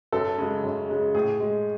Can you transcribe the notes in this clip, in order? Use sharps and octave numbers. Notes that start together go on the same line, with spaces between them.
F#2 A4
C#3 G#3
F#2
C#3 G#3
A2 G#4
G#3